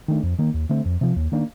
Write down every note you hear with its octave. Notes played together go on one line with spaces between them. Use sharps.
D#3 A3 D4
F2
D#3 A#3
D#2
D3 A3 C4
F2
C3 F3
D#2
D#3 A#3 D4